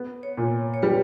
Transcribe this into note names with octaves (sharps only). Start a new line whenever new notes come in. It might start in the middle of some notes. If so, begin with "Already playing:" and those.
Already playing: B3
C#5
A#2
C#5
G3 B4